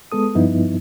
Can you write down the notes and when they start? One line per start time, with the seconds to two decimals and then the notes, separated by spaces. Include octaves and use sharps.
0.12 G#3 B3 A4 D#6
0.35 G2 F3 B3 D#4 E4